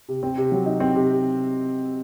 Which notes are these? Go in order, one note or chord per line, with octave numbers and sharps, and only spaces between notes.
C3
C4
C3
F#3
D#4
C4
C3